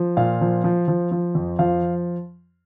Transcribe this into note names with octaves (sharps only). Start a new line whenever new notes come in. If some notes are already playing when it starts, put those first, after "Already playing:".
Already playing: F3
A#2 F5
F3
F3
F3
F3
F2
F3 F5